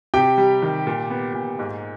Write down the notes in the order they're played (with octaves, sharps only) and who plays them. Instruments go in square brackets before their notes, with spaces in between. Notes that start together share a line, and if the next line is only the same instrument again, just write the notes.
[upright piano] C3 [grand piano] G4 G5
[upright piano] G3
D#3
A#2
B3
A#2
G#2